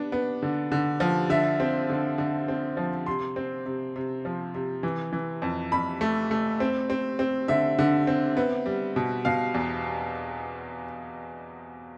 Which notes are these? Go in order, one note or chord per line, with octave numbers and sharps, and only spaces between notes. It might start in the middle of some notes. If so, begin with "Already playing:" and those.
Already playing: B3 D4
B3
D3
D3
F3
D3 E5
C4
D3
D3
C4
F3
C3 C6
C4
C3
C3
F3
C3
E3
E3
F2
F2 B5
A3
A3
C4
C4
C4
D3 E5
D3
C4
B3
G3
B2
B2 F5
E2